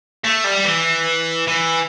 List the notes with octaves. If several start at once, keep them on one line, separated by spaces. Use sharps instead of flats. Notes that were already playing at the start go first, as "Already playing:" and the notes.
A3
G3
E3
E3